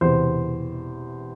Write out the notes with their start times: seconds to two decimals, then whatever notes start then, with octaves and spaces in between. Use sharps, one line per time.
0.01 E1 E2 C3 C5